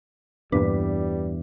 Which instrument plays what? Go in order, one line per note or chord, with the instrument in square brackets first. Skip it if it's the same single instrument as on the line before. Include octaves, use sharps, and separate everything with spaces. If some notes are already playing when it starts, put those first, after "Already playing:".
[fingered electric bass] E2 [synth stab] G2 A#2 [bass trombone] G3 [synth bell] D4 B4